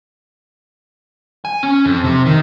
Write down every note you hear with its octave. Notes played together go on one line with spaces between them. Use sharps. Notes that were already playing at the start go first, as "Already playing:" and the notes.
G#5
C#4
F2
C3
D#3